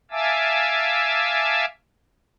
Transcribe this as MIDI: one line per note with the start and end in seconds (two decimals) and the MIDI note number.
0.11 1.65 76
0.11 1.65 77
0.11 1.65 80
0.11 1.65 81
0.11 1.65 86
0.11 1.65 88